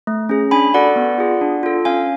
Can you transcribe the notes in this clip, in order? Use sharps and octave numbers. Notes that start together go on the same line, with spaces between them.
A3
C#4 G#4
D4 G#5 B5
F#4 A4 D5 F#5
B3
F4 G#4
D4
F4 A4
C#4 F5 G#5